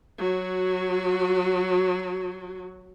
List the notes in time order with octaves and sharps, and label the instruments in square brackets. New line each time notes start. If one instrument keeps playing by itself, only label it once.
[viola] F#3 F#4